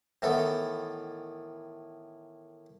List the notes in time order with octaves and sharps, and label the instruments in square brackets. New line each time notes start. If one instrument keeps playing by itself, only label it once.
[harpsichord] A2 D#3 E3 B3 A4